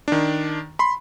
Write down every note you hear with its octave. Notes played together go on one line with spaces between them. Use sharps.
D#3 D4
B5 C6